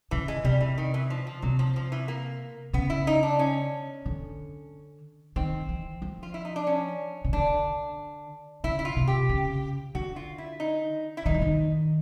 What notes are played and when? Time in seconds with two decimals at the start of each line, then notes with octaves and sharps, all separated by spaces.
0.11 C#3 E3
0.28 G#3
0.44 C3 G3
0.61 E3
0.78 D#3
0.94 E3
1.10 F3
1.27 F3
1.42 C3 F#3
1.59 F3
1.76 F3
1.92 E3
2.08 A#3
2.73 C#3 B3
2.90 E4
3.07 D#4
3.23 D4
3.39 C#4
4.06 D3
5.36 D#3 C4
5.69 E3
6.02 F3
6.23 F4
6.34 E4
6.45 D#4
6.56 D4
6.67 C#4
7.24 C#3
7.33 D3 D4
8.64 C#3 E4
8.79 E4
8.85 F4
8.96 C3
9.07 G4
9.29 C#3
9.95 D3 F#4
10.16 F4
10.38 E4
10.60 D#4
11.17 E4
11.26 D#3 D#4
11.34 E3
11.42 D#3